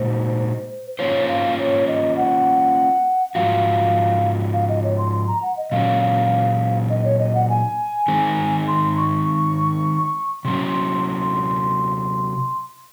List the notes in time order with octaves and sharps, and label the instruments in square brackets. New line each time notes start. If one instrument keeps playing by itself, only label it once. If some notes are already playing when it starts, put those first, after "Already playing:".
Already playing: [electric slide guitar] A#2 G#3 D#4 F#4 [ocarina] C5
[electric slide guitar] A#3 C#4 F4 C5 [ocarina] C#5
[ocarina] F5
C#5
D#5
F#5
[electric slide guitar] G#2 F3 F#4 [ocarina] F5
[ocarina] F5
D#5
C#5
C6
C6
A#5
F#5
D#5
[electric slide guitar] A#2 F#3 C#4 [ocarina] F5
[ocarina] D#5
C#5
D#5
F#5
G#5
[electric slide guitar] D#3 G#3 C4
[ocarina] C6
C#6
[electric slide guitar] C3 F#3 C#4 [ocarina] C6